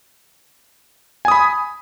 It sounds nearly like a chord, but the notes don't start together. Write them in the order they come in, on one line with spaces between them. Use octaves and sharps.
G#5 D#6 B5